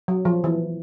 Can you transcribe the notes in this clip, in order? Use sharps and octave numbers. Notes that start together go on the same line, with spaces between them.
F#3
F3
E3